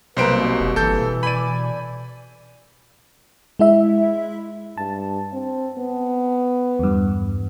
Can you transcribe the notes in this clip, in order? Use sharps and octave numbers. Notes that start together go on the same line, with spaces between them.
B1 C3 G3 A#3 B4 C5 D7
B2
F1
G1 E3 A4 G6
B2
D5 G#5 B5 D#7
G#3 E4 E5
G2 A5
C4
B3
E2 G2